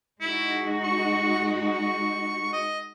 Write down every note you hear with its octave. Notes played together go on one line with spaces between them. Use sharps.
G#3 D#4 E4 F#4
C#6
C#6
D#5